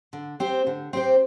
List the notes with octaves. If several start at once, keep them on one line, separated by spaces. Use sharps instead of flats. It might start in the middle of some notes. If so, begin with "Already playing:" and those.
D3
C4 G4 C5
D3
C4 G4 C5